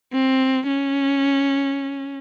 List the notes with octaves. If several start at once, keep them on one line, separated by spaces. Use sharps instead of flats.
C4
C#4